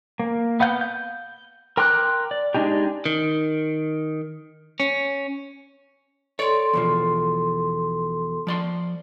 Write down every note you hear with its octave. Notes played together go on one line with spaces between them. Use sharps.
A#3
B3 F5 F#5 G6
G6
A#4 G5 C6 D6 F#6
D5
G#3 D4 D#4 G4
D#3
C#4
A4 C#5 D5 C6
E2 B2 F3
F3 D5 C6